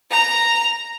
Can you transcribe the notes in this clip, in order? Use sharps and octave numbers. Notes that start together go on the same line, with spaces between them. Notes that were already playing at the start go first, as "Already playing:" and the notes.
A#5